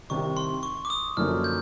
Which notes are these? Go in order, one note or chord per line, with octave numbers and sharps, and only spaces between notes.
C2 C3 D#3 C#6
C6
C#6
D6
D#6
F#2 D3 F3 A#3 D#4 F6
G6